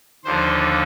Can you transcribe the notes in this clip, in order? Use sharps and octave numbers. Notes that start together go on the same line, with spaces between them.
D#2 D3 F3 C5